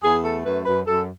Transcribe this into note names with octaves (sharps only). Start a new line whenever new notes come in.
E2 G#4
A3 A4
F#2 B4
F#2 B4
F#2 A4